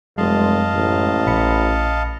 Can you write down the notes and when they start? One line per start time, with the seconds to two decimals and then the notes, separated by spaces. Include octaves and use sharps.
0.18 F1 F#2 G#3 D#5 F5 A5 C6
0.74 A1
1.27 A#1 B5 C#7